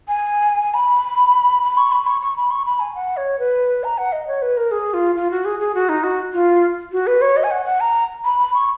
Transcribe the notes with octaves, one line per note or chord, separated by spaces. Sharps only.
G#5
B5
B5
C#6
B5
C#6
C#6
B5
C#6
B5
G#5
F#5
C#5
B4
A#5
F#5
D#5
C#5
B4
A#4
G#4
F4
F4
F#4
G#4
G#4
F#4
D#4
F#4
F4
F#4
B4
C#5
D#5
G#5
F#5
F#5
A#5
B5
B5
C#6